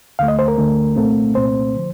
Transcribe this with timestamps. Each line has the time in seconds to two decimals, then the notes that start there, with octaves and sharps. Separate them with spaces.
0.19 D2 D3 A3 F5
0.28 D#5
0.39 C5
0.48 A#4
0.58 D2 D3 A3
0.96 C2 A#2 A3 C4
1.35 C2 A#2 A3 C4 C5
1.76 D3 F3